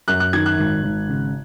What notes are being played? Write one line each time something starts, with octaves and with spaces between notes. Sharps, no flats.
F#2 F#6
F#6
D#3 G#6
F#6
G#1
G#1
C#3